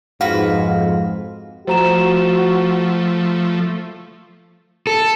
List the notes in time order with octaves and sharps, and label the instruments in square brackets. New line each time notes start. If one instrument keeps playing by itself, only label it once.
[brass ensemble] F2 G#2 [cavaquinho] F#4 B4 [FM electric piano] F5
[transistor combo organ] F3 A3 [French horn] F#4 [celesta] C5 A#5 E7
[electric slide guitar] A4